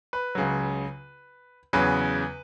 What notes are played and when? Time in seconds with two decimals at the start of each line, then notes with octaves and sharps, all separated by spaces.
0.13 B4
0.35 C#2 C#3 F#3
1.73 E2 C#3 F#3 B4